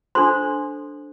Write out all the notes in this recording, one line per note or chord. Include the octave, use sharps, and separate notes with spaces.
D4 A4 C5 C6